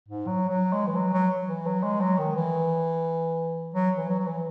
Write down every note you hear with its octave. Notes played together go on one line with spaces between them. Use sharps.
G#2
F#3
F#3
G#3
E3
F#3
F#3
E3
F#3
G#3
F#3
D#3
E3
F#3
E3
F#3
F#3
E3